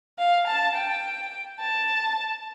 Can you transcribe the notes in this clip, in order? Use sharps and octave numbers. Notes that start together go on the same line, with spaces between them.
F5
A5
G5
A5